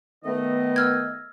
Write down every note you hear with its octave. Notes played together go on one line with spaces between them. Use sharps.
D#3 A3 B3 D#5
E6 F6 G#6